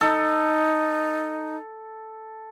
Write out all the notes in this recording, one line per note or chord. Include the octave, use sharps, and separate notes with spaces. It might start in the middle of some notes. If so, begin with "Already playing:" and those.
D#4 A4